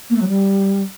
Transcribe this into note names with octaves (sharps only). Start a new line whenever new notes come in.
A#3
A3
F#3
G3